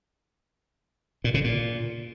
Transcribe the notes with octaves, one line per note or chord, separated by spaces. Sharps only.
A#2
C#3
A#2